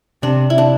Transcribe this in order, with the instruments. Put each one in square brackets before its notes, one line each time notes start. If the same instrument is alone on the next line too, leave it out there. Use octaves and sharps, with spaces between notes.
[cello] C3 [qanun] D4
[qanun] E4
D4